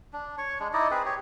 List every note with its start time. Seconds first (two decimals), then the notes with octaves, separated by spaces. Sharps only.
0.13 D4
0.38 C#5 C#6
0.60 G#3 D4
0.73 D#4 E4 D5 D#5
0.91 C4 G#4 B4
1.05 G4 C#5